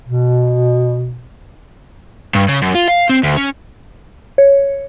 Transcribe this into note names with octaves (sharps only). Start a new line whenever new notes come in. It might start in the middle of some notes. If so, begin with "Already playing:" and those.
B2
G2
C#3
F#2
F4
F5
C4
D2
C#4
C#5